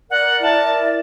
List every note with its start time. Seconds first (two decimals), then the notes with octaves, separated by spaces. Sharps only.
0.10 A#4 D5 F#5
0.42 E4 A5